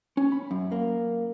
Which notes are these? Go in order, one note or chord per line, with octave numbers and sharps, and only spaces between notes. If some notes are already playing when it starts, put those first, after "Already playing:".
C#4
B5
F#2
A#3